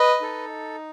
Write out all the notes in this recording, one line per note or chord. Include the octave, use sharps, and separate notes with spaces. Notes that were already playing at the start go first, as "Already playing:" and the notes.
Already playing: B4 D#5
D#4 A4